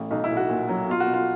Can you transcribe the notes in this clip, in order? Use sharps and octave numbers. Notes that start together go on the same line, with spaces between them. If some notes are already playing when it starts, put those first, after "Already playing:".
Already playing: A1
B1 D#4
E4
B1
F#4
A#2
F#3
B2 F4
F#4
B2
F4